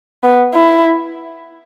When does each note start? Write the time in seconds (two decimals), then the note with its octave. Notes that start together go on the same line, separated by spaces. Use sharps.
0.23 B3
0.54 E4